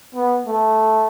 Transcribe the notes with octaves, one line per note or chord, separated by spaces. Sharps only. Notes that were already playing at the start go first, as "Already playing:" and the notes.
B3
A3